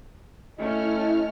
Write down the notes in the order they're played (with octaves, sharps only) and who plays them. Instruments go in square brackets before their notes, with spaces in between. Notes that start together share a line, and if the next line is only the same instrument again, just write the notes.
[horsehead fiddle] A3 C#4 [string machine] E4 F6 [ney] D#5